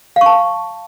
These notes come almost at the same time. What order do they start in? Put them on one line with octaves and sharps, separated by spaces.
F5 C#6 A5